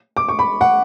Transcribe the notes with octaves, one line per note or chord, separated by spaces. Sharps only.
D6
C#6
B5
F#5